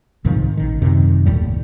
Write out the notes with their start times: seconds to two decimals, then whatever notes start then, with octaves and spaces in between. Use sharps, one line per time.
0.25 C2 G#2 D#3 F3
0.57 A1 D#3
0.82 F#2 C3 D#3
1.26 G1 D#2 A2 G3